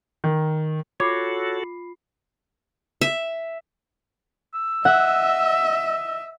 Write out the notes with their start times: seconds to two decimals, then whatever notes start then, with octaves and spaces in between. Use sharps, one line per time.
0.24 D#3
1.00 F4 F#4 A4 C#5 B5 D6 C7
3.01 E5
4.54 E6
4.85 D#5 E5 F#5